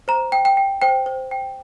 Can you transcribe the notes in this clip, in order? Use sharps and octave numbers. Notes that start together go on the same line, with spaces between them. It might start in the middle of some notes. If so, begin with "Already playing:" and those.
C5 A#5
G5
G5
G5
C5 G5
C5
G5